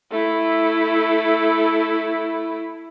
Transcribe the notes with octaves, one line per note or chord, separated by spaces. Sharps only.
A3 E4